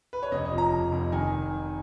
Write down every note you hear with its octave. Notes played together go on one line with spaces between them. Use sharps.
B4
C#5
F1 D#5
D#5
F3
A#5
F1
F1
D#3 G#5